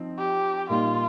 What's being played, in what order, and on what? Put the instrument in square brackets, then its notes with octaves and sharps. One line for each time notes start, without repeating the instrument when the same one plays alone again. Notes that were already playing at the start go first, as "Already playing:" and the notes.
Already playing: [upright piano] F3 C4 D#4
[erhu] G4
[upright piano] A#2 G3 A#3 D#4 [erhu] F4